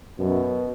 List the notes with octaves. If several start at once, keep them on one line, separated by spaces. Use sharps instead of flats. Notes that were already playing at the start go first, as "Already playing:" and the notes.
F#2 B2